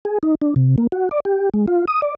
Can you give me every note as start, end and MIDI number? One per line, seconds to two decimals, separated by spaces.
0.05 0.18 68
0.23 0.35 63
0.42 0.54 62
0.56 0.76 48
0.78 0.87 58
0.92 1.09 66
1.11 1.20 74
1.25 1.49 67
1.54 1.66 56
1.68 1.85 65
1.88 2.01 87
2.02 2.15 74